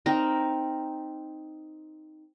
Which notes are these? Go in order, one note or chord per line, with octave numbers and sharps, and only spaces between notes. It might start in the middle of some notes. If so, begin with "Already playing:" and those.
C4 D#4 A#4